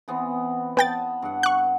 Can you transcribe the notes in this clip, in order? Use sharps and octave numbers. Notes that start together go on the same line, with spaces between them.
E3 B3 C4
B3 D#5 G5 A5 B5 A6
G2 F#5
C#6 F#6